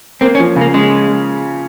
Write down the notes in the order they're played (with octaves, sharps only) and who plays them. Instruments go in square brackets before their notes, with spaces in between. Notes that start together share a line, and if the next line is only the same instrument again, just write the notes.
[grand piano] A#3 [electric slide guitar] C4
[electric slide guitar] C#4
[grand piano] F3
C#3
[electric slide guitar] A#3
[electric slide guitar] G#3 [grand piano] C#4